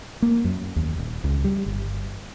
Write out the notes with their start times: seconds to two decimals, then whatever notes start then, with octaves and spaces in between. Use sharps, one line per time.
0.22 A#3
0.44 F#2
0.76 D#2
0.98 D#1
1.24 C#2
1.44 G3
1.66 G1